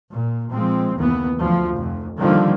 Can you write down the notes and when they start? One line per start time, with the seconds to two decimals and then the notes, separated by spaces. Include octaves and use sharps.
0.10 A#2
0.51 A#2 F3 G#3 C4
0.95 F#1 D#2 E3 B3
1.37 D2 F3
1.75 F1 F2
2.18 D3 D#3 F3 G3 A#3